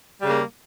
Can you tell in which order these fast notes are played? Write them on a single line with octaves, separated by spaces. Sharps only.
G3 C#3 A#3